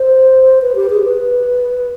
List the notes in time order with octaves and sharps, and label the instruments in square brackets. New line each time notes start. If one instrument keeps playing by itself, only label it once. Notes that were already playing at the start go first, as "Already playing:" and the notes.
Already playing: [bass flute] C5
B4
G4
G#4
B4